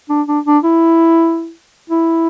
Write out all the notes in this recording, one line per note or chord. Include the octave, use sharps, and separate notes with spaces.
D4
D4
D4
E4
E4